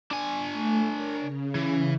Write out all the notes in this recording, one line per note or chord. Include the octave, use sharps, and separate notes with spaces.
D4 G#5
A3
A#4 C#5
C#3
E3